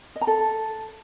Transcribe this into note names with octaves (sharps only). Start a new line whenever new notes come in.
D#5
A#5
A4